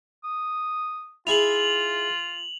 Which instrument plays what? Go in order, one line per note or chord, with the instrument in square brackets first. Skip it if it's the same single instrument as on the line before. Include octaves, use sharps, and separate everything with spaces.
[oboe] D#6
[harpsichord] E4 G#4 [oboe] F4 [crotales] F7 F#7